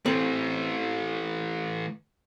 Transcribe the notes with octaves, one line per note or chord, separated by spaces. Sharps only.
E3 A3 C4